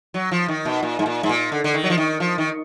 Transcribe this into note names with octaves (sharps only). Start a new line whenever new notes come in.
F#3
F3
D#3
B2
A#2
G#2
A#2
G#2
A#2
D3
D3
D#3
F#3
F3
D#3
F3
D#3